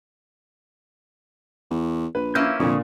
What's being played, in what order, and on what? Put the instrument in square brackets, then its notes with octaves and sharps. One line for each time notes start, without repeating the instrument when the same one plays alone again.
[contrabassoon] E2
[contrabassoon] A#1 [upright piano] B4
[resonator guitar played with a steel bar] A#3 C#4 E4 [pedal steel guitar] F5 E6 G6
[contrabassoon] F2 [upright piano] A#2 D4 [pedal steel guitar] D3 C#6 D#6